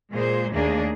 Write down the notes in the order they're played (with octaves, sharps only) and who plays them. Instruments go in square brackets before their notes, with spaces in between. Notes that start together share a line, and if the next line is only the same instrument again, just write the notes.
[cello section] A#2 G#3 G#4 C5
D#2 A3 A#3 D4 G#4